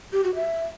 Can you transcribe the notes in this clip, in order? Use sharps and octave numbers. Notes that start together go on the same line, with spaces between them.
G4
F#4
E5